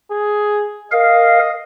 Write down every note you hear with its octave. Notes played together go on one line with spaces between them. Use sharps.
G#4
A#4 D#5 F5